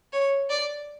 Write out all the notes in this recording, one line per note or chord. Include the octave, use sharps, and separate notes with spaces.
C#5
D5